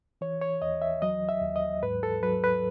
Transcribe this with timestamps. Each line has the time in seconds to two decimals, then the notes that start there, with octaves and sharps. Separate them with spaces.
0.21 E3 C#5
0.42 C#5
0.62 D#2 D#5
0.82 E5
1.02 F#3 D#5
1.29 E5
1.42 D#2
1.56 D#5
1.83 G#2 B4
2.03 A4
2.23 F#3 B4
2.44 B4